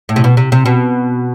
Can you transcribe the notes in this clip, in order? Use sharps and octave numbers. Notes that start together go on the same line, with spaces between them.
A2
C3
B2
C3
C3
B2